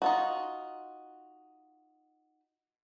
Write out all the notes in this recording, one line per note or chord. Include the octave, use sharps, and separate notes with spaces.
D#4 F4 F#4